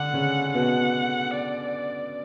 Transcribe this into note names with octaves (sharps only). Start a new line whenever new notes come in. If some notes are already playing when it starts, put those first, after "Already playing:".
Already playing: D3 D4 F#5
C#3 C#4
B2 B3 F#5
D5